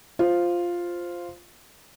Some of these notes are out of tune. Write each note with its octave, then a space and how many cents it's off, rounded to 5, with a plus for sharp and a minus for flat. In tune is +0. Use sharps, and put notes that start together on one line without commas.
F4 +0 C5 +0